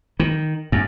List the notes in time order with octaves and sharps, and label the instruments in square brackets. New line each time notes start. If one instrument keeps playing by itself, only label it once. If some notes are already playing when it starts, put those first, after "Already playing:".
[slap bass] D#3
F#2